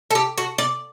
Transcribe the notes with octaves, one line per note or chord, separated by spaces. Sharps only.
A4
G4
F#4
D5